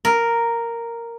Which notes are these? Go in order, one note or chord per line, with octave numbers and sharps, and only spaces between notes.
A#4